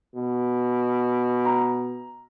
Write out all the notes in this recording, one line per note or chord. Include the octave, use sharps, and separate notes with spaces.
B2
A#5